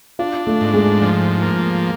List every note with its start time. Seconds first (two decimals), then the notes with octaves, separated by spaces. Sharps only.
0.19 D4 F4
0.47 A3 A4
0.61 G#2
0.74 G#3 G#4
1.01 F3
1.42 A#3